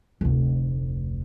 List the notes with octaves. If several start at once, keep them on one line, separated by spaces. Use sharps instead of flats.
F1 D2